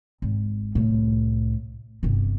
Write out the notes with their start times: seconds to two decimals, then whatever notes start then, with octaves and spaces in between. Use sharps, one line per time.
0.22 G#1
0.75 C2 A2
2.03 G1 C3